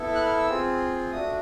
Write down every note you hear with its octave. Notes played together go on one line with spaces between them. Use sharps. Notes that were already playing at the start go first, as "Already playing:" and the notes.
Already playing: B3 E4 A4
F#6
F6
E6
C4 F4 G#4
A3 D4 F#4 D#6